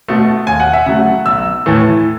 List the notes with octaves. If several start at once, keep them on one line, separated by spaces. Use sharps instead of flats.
B2 A3
D#2 G#5
F#5
E5
C#3 F#3 A3 F#5
B1 E6
A2 E3 A3